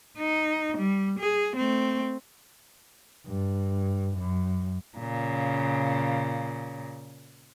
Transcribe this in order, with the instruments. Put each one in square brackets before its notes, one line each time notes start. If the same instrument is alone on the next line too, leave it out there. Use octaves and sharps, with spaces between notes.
[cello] D#4
G3
G#4
A3 C4
[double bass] G2
F#2
[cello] A#2 C#3